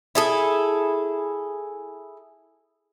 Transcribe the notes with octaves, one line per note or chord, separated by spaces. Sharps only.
E4 G#4 A4